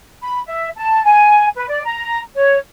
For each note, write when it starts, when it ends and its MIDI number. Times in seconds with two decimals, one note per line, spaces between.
0.21 0.39 83
0.47 0.67 76
0.77 1.02 81
1.03 1.47 80
1.55 1.67 71
1.68 1.81 74
1.84 2.18 82
2.36 2.57 73